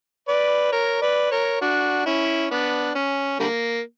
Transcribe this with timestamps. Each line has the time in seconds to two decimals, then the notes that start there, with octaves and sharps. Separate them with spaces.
0.28 B4 D5
0.72 A#4 C#5
1.02 B4 D5
1.31 A#4 C#5
1.61 D4 F#4
2.05 C#4 E4
2.51 B3 D4
2.95 C#4
3.40 D3 G3 A#3